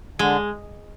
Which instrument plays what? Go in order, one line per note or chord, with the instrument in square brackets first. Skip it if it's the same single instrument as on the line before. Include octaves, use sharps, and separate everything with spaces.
[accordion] D3 [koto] G#3